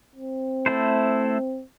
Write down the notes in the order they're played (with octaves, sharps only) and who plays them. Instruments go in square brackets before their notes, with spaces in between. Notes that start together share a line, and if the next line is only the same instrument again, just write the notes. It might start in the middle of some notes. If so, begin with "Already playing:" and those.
[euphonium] C4
[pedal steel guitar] A3 E4 A4 C5